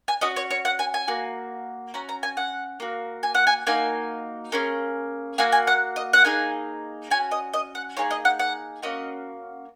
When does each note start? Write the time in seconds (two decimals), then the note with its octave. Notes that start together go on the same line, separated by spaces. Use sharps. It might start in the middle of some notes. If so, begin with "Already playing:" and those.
0.08 G#5
0.21 C#4 F#4 D#5
0.36 C#5
0.51 C#5
0.65 F#5
0.79 G#5
0.94 G#5
1.08 A#3 F#4
1.94 C#4 F#4 A#5
2.09 A#5
2.23 G#5
2.37 F#5
2.80 A#3 F#4
3.23 G#5
3.35 F#5
3.47 G#5
3.67 A#3 D#4 F#4 G#5
4.52 A#3 C#4 G#4
5.38 A#3 F#4 G#5
5.52 G#5
5.67 F#5
5.96 D#5
6.13 F#5
6.24 A#3 D#4 G#4 G#5
7.10 C#4 F#4 G#5
7.31 D#5
7.54 D#5
7.75 F#5
7.97 A#3 D#4 G#4 C#5
8.11 D#5
8.25 F#5
8.40 F#5
8.82 A#3 C#4 F#4 D#5